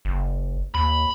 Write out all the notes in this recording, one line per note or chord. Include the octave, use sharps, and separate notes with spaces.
F#1
D#2 B5